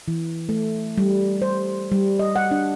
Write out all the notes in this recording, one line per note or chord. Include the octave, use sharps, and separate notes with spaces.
E3
A3
G3
C5
G3
D#5
F#5
D4